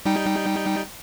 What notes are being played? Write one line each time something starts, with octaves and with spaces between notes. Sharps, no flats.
G3 D#4 G5